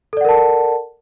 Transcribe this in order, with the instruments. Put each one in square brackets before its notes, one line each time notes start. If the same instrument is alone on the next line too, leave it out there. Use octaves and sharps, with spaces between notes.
[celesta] A4
D5
F#5
A#4
A5